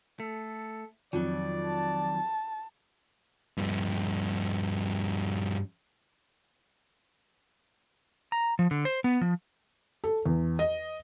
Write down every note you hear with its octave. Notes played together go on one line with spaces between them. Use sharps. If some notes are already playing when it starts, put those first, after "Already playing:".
A3 A4
F2 D#3 F#3 D5
A5
G2 F3
A#5
F3
D3
C5
B3
F3
A4
E2
D#5